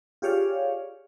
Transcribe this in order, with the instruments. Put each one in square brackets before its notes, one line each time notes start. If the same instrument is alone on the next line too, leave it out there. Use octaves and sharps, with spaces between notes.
[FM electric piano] F4 G4 G#4 C#5 D5 F5